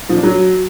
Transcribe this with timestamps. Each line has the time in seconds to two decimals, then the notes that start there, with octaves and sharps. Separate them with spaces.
0.09 F3
0.16 D4
0.23 F#3